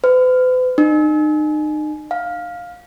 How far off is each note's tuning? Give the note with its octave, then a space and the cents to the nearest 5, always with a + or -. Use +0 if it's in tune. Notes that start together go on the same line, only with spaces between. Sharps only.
B4 +45
D#4 -35
F5 +10